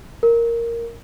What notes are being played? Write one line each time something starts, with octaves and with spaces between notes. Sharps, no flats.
A#4